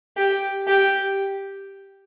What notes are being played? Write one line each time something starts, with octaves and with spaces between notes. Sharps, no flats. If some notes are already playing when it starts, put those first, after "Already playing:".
G4
G4